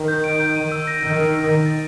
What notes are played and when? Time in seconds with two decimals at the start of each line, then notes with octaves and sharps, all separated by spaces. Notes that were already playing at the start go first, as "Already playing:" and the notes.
Already playing: D#3
0.08 G6
0.24 D7
0.40 G6
0.56 D#7
0.72 E6
0.87 A#6
1.03 D#3 G6
1.19 D#7
1.34 E6
1.50 A#6
1.66 A6